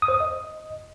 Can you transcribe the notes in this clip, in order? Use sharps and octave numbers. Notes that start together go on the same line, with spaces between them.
D#6
C5
D#6
D#5